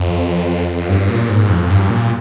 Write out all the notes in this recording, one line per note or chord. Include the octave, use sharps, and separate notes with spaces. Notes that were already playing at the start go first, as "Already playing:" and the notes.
Already playing: F2
G2
A#2
G#2
F2
G2
A#2